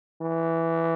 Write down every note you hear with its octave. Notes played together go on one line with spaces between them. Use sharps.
E3